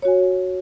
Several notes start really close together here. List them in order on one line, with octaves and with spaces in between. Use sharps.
C#5 F#4 G#5